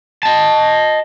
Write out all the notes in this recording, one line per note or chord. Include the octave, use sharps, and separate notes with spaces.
D#5 A5